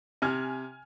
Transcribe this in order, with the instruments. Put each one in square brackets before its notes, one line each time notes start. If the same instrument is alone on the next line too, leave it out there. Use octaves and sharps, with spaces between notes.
[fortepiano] C3 [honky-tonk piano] G#5 F6 G#6